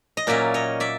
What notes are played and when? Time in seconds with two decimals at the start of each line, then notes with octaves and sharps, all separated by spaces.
0.17 D#5
0.27 A#2 F#3 A#3 C#4 D5 E5
0.54 C#5 D#5
0.80 D5 E5